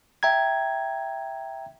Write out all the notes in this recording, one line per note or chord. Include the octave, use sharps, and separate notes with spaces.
E5 G5 A#5 G#6